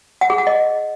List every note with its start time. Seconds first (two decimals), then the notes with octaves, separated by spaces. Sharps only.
0.21 F#5
0.30 G#4
0.38 F#5
0.47 D#5